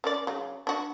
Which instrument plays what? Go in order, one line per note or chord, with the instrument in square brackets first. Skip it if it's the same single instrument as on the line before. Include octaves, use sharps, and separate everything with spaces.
[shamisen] C#4 A#4 D5
C#3 F#3
D4 F#4